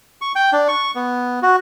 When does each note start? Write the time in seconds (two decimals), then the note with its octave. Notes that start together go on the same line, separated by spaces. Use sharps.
0.21 C#6
0.35 G5
0.53 D4
0.68 C#6
0.95 B3
1.43 F#4